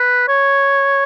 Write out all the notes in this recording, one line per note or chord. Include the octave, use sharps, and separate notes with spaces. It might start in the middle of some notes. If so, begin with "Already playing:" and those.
Already playing: B4
C#5